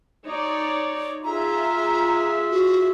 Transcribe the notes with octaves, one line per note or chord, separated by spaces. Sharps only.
D#4 C#5 D5
F4 G#4 E5 A#5
F#4